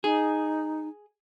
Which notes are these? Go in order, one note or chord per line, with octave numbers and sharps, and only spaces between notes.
D#4 G#4